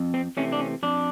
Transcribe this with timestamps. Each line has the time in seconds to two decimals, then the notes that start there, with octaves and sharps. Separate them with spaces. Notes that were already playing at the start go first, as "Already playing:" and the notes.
Already playing: F2
0.14 C4
0.37 C3 E3 A3 C4 C#4
0.52 D4
0.60 C#4
0.83 F2 D4